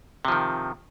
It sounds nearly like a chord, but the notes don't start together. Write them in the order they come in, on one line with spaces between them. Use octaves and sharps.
C3 F3 D#3